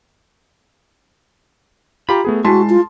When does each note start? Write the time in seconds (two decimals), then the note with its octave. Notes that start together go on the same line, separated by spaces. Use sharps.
2.09 F4 G4 A#5 B5
2.25 A3 B3 G#4
2.45 G#3 E4 F#4 A5 C6
2.70 F4